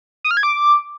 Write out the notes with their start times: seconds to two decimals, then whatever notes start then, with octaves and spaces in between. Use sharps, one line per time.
0.24 D#6
0.31 F6
0.37 G#6
0.43 D6